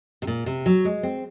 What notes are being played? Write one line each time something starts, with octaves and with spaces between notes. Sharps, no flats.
C3
A#2
C3
F#3
G#3
C4